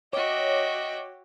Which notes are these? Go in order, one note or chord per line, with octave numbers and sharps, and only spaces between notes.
F#4 C#5 D#5 E5 G5 D6